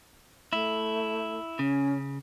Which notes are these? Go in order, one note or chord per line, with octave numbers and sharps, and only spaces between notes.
A3 E4
C#3 C#4